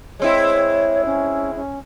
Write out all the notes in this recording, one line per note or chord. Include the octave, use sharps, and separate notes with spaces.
G#3 C4 E4 C#5
C#4
C#4